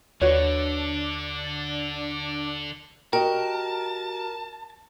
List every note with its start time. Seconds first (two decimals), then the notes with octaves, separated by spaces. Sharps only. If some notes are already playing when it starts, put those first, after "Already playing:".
0.21 D#2 D3 D4 F#4 B4 C#5
3.13 F#4 G4 A#4 D#5 G5 A5